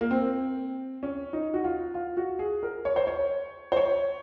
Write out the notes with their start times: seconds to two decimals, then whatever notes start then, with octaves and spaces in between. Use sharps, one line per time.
0.01 A#3
0.11 C4
1.03 C#4
1.33 D#4
1.54 F#4
1.64 F4
1.94 F4
2.17 F#4
2.39 G#4
2.63 A#4
2.85 C#5
2.96 C5
3.07 C#5
3.72 C5
3.77 C#5